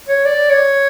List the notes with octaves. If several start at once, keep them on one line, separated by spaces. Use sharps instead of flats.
C#5
D5
C#5